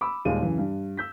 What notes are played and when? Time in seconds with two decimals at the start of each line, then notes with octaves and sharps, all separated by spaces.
0.01 B5 D6 E6
0.25 D#2 A#2 G3 G#3 D#7
0.40 F#2 C#3 E3
0.58 G2
0.97 E6 G6 B6